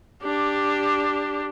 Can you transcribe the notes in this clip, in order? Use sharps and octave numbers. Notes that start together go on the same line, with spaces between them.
D4 G4